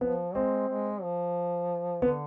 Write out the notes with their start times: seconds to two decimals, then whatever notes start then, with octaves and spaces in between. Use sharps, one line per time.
0.01 F3 B3
0.35 G#3 C4
0.68 G#3
1.02 F3
2.02 D3 B3